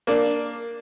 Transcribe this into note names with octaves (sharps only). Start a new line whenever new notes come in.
A#3 D4